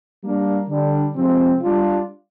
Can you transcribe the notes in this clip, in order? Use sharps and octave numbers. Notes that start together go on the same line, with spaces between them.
G3 A#3 D4
D3 G3 D4
C3 F3 G#3 C4
G3 D4 F4